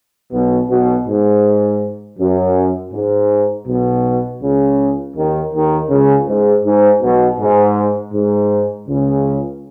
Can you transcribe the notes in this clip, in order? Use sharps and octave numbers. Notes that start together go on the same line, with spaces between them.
B1 B2
B1 B2
G#2
F#2
G#2
B1 B2
C#2 C#3
D#2 D#3
D#2 D#3
C#2 C#3
G#2
G#2
B1 B2
G#2
G#2
C#2 C#3